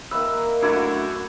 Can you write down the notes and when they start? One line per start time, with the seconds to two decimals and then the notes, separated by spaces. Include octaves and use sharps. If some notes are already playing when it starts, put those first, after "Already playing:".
0.11 D#3 A#3 B4 E5 E6
0.62 F#2 A3 D4 E4 F#4 G#5 D6